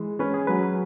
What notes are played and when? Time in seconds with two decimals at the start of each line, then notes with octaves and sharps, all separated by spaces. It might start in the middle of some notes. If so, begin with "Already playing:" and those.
Already playing: E3 G#3
0.19 C#4 B4
0.34 G#4
0.47 F#3 B4